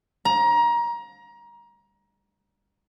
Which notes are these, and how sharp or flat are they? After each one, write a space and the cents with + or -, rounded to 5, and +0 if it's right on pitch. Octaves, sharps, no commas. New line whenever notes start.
A#5 +25